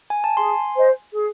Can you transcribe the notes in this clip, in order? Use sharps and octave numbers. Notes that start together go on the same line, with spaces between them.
G#5
A5
G#4 G#5 C6
C5 D#5
G#4